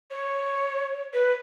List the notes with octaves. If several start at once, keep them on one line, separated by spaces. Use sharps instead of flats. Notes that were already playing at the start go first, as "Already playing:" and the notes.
C#5
B4